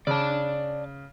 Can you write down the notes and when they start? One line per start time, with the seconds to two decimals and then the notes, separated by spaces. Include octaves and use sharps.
0.07 C#3 D5 A5